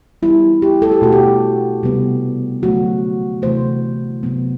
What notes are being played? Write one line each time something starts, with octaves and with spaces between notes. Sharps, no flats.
E3 G3 B3 E4
G4
A4
G4
B2 A3 F#4
G4
C3 G3 B3
D3 F#3 A3 F#4
C3 E3 A3 C5
C3 F#3 B3